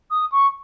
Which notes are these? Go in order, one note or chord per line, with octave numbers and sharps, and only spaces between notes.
D#6
C#6